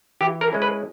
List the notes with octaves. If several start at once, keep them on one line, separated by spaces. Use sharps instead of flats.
E3 G4
A#4
G#3 C#4 E4
B4